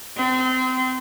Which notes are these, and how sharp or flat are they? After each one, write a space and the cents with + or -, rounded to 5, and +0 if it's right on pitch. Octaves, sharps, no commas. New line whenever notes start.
C4 -30